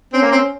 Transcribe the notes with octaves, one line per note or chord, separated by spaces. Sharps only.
C4 C#4
A#3
C4